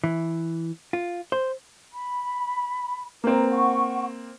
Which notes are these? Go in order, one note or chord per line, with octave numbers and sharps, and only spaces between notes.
E3
F4
C5
B5
A#3 C4 B4 A#5
F#5 C#6